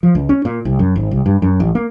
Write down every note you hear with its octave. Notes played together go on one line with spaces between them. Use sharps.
F3
C#2
C#4
A#2
C2
F#2
G#1
C2
G2
F#2
A1
A#3